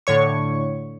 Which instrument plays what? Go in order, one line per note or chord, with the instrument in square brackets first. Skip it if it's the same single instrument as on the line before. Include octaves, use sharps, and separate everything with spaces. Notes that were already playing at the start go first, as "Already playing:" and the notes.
[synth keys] A2 D3 C#5 C#6